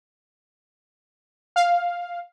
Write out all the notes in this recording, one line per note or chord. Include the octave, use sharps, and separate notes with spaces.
F5